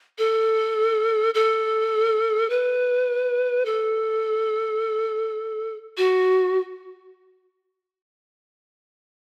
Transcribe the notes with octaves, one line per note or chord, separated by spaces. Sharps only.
A4
A4
B4
A4
F#4